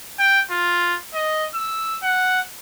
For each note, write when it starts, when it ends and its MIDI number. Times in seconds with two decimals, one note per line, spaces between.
0.19 0.41 79
0.51 0.97 65
1.14 1.46 75
1.55 1.98 88
2.03 2.41 78